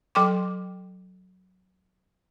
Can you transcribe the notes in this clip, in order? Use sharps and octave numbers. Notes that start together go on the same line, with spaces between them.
F#3 A4 G5 C6 D6